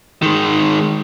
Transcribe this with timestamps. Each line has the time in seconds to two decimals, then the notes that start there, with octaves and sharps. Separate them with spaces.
0.22 D#3 G#3